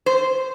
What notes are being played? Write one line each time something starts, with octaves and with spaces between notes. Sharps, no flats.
C5